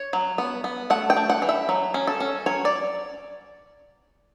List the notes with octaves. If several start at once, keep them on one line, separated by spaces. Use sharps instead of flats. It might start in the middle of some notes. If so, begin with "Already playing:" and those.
Already playing: C#5
F#3
B3
B3
A3 F#5
G5
A3
F#5
E3
E5
F#3
C#4
A4
C#4
F#3 C#5
D5